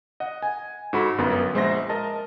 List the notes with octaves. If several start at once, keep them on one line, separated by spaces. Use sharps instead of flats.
D#5 F#5
G#5
G#2 F#4 A4 B5
G1 F#2 B3 F#5
A#1 G#3 C5 E5 C6 A#6
A#4 D#5 A5